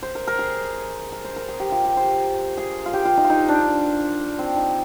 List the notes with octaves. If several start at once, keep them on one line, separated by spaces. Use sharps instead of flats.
C5
A#4
A#4
G#4
A#4
C5
A#4
G#4
G4
F4
G4
C5
G#4
F4
G4
F4
D#4
F4
D#4
D4
C4
D#4